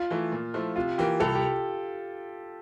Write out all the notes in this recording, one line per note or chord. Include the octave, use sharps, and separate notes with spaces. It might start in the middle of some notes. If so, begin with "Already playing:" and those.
Already playing: F4
E3 A3 E4
A#2
F3 A3 E4
C3 F4
E3 A#3 G4
C2 A4
G4